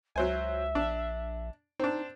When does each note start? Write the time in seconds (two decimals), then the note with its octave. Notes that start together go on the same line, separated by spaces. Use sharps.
0.16 C#2 F#3 C5 E5 G#5
0.75 A#1 D4
1.79 C4 D4 D#4